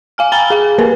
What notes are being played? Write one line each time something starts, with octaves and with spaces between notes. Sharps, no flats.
F5 G#5 F6
G5 G#5 A#5 B5 A6 G7
G#4 F5
A#3 A#4 B4